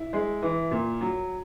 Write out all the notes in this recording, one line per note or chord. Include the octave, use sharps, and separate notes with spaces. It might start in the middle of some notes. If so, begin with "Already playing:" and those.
Already playing: E4
G#3
E3
A#2
F#3